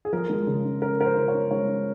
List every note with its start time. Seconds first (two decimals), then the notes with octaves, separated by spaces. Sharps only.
0.05 G#4
0.13 F3 A#4
0.30 G#3
0.47 C#3
0.65 C#4
0.82 C#4 A#4
0.99 C#4 A#4
1.05 C5
1.16 C#3
1.28 C#5
1.34 C#4
1.51 G#3 C#5
1.68 C#4